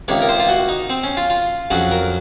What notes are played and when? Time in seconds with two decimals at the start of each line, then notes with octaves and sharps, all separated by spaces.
0.08 C#2 C3 D#3 A#3 C#5
0.22 A#4
0.29 C5
0.40 F4
0.49 F#4
0.69 D#4
0.90 C4
1.04 C#4
1.17 F4
1.30 F4
1.71 F2 C#3 F#3 F#4
1.91 A#4